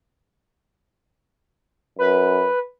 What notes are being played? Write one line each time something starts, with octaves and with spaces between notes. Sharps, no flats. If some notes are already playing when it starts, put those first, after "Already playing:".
F#2 B4